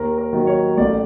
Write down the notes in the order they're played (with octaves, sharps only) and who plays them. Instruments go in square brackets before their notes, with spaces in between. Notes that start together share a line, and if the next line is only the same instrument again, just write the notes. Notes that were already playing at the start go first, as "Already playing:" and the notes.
Already playing: [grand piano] D#2 A#4
A#4
D#3 F#3
C#5
A1 D5